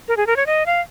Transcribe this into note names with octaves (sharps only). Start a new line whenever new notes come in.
A#4
G#4
A#4
C#5
D#5
F5